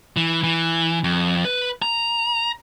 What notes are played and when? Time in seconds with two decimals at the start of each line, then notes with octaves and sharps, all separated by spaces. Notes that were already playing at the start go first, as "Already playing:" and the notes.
0.16 E3
0.43 E3
1.04 F2
1.45 B4
1.82 A#5